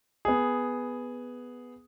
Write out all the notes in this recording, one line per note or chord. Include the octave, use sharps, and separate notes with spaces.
B3 G#4